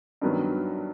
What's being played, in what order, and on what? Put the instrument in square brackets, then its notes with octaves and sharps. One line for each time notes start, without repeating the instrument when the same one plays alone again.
[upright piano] G2 D#3 F#3 B3